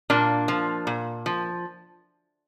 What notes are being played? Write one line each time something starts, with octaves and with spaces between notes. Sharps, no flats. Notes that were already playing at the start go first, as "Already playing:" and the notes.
A#2 A#3 D4
F3
A#2
F3